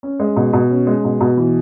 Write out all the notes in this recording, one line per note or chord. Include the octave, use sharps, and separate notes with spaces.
C#4
G#3
B2
B2
C#4
G#3
B2
B2
E3